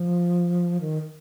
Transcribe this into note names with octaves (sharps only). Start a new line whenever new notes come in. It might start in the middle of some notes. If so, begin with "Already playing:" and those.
Already playing: F3
D#3